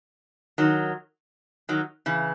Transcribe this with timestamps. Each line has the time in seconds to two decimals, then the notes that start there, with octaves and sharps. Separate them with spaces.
0.58 D#3 F#3
1.69 D#3 F#3
2.06 C#3 E3